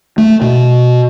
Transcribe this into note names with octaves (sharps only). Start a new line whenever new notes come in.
A3
B2